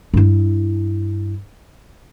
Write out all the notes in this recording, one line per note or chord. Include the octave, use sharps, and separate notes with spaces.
G2 E4